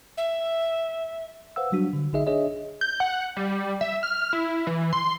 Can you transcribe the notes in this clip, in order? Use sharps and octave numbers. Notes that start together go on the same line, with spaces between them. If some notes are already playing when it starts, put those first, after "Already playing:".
E5
B4 C5 F5 F#5 E6
F#3 G3 D4 F#4
D3
A#1 D3 D#4 G#4 D#5 E5
D4 G#4 C#5 D#5 E5
G6
F#5
G3
E5
F6
E4
E3
C6